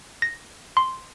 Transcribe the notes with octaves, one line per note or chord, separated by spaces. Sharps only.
A#6
C6